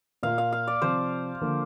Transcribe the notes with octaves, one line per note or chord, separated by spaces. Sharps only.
A#2 A#3 F4 F5
F5
F5
D5
C3 F3 C4 C5
D3 F3 A#3